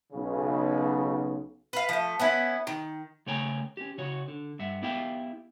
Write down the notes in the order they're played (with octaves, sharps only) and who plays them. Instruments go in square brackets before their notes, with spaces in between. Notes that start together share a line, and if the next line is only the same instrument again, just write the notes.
[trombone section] B1 C#3
[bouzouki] B4 F5
F3 A3
B3 C#4 E4
D#3
[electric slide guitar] C#3 A3 C#5 G5 G#5 A#5
C#4 G4
C#3 F#4 C#5
D3
G2 E5 F#5
B3 E4 G4 E5 F5 G5